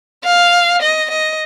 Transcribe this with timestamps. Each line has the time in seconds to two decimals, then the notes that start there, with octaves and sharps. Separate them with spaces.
0.24 F5
0.82 D#5
1.10 D#5